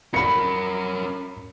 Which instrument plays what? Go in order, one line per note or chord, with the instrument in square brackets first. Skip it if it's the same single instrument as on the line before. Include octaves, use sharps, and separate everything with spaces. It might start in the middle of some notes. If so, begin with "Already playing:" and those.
[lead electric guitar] C#4 A#4 [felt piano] B5 C#7